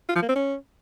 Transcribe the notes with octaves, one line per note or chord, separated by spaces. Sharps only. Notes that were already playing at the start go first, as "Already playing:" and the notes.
F4
F3
A#3
C4
C#4